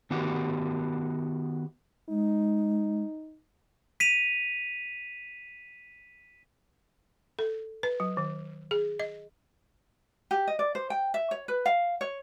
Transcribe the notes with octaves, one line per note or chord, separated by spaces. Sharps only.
D#3 B3 F#4 G4
G#3 D#4
B6 D#7 F7
A4
B4
F#3
D#3
G#4
D#5
G4
D#5
D5
C5
G5
E5
C#5
B4
F5
C#5